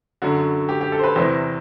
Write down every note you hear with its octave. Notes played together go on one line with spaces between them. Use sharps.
F#2 D3 F#4
G4
G4
A4
C5
B4
E2 C3 E3 C5